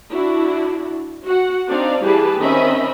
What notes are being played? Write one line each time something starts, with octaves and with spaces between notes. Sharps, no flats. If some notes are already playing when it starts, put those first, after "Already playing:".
D4 E4 F#4
F#4 F#5
C4 D4 D#4 D5 F5
E3 G3 G4 G#4 B4 A5
D#3 C4 C#4 D#5 E5 B5